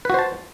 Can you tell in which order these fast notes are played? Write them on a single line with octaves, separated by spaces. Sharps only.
B4 F#4 C5 A5